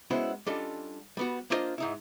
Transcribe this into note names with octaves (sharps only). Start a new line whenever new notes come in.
G#3 B3 C#4 E4 F#4 C5
G3 C#4 D4 F4 A4 D#5
G3 B3 F#4
A#3 D4 E4 F4 C5 D#5
G#2 D#4 E4